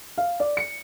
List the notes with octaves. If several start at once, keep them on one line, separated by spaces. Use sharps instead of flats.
F5
D5
C#7